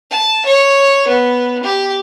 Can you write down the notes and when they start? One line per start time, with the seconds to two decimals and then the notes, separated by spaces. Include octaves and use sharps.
0.11 A5
0.45 C#5
1.07 B3
1.63 G4